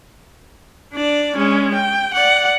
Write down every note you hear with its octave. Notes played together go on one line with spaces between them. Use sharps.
D4 D5
G#3 C#4
G5
D5 F#5